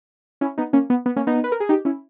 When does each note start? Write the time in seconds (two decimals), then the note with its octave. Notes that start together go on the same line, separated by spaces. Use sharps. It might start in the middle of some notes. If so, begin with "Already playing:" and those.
0.41 C#4 E4
0.58 B3 D#4
0.73 A#3 C#4
0.90 B3
1.06 B3
1.16 A#3 C#4
1.27 B3 D#4
1.44 B4
1.52 A#4
1.60 G#4
1.69 D#4 G4
1.85 C#4 E4